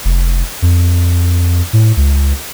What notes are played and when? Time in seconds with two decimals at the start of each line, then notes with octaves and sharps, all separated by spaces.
0.05 F1
0.62 F2
1.73 A2
1.97 C#2